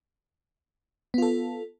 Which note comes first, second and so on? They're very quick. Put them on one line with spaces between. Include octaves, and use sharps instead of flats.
B3 F4 A4